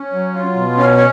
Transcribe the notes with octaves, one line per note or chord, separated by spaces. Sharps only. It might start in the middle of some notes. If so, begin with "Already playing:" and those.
Already playing: C#4
F#3
F4
B2
C#4 F5
C#5